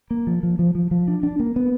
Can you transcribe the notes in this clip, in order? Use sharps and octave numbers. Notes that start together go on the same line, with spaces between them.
A#3
F3
F3
F3
F3
F3
D4
D4
A#3
B3